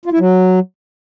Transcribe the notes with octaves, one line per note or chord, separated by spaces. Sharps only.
F4
E4
F#3